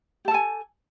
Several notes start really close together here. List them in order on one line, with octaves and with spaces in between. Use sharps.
G4 A5 A4 G#5